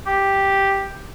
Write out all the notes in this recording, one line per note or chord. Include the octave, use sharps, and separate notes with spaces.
G4